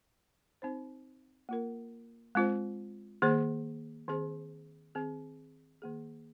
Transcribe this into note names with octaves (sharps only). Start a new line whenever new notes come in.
C4 D#4 C5
A#3 F4 A#4
G#3 C4 F4 C5
D#3 A#3 G#4 C5
D#3 C4 G#4 C5
D#3 C4 G#4
D#3 A#3 G#4